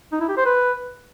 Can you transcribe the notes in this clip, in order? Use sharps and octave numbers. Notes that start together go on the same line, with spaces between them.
D#4
E4
G4
C5
B4